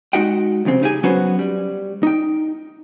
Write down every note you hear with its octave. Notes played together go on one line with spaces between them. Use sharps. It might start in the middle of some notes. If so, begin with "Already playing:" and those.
G#3 D#4 F#4 D#5 F#5 G5
C2 F2 C#3 C4
C#3 D#4 G4 G#4 G#5
F#3 B3 C#4 F#4 B4 C5
G3
D#4 G5